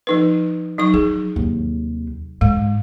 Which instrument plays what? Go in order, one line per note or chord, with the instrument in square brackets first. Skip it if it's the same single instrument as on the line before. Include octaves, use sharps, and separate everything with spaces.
[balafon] F3 D#4 B4
F#3 D#4 C#6
[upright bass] F#3 [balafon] G#4
[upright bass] D#2 C3
[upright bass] G#2 [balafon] G#3